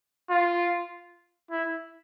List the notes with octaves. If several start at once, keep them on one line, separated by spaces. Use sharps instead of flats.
F4
E4